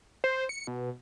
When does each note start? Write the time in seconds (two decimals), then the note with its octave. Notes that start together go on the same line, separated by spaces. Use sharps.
0.24 C5
0.49 C#7
0.67 B2